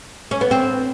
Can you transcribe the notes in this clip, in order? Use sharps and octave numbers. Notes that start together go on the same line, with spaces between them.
C#4
B3
C4